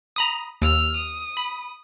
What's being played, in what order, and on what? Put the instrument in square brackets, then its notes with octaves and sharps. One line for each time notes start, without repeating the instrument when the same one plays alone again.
[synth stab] A#5 B5 D#6
[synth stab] D#2 [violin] E6 F6
[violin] D#6
[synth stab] B5